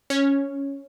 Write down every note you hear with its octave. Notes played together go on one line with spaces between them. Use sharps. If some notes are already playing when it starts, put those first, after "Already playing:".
C#4 C#5